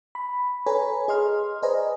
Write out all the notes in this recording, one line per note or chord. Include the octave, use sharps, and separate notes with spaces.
B5
A4 B4 C#5 G#5 A#5 B5
G#4 D#5 C6 F6
B4 C5 D5 D#5 G#5 A#5